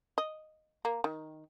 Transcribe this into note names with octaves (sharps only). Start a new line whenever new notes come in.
D#5
A#3
D#3